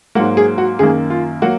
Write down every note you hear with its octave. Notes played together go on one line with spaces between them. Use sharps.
G#2 F#3 A#3 F#4
G#4
F#4
F#2 D#3 A#3 G#4
F4
F#3 A#3 F#4